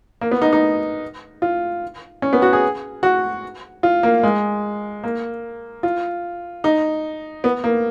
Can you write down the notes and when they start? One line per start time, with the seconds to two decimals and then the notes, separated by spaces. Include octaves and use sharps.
0.21 A#3
0.31 B3
0.42 D#4
0.53 D#4
1.42 F4
2.22 C#4
2.33 B3
2.42 F#4
2.53 G#4
3.03 F#4
3.83 F4
4.03 A#3
4.23 G#3
5.04 A#3
5.83 F4
6.64 D#4
7.44 B3
7.64 A#3